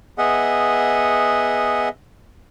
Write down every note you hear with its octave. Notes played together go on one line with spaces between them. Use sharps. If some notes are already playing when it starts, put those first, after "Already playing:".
B3 G#4 D#5 E5 F#5